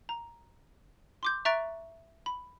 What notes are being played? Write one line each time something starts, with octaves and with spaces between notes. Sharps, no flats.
A#5
C6 D6 G6
E5 A#5 C#6 F#6 A6 D7
B5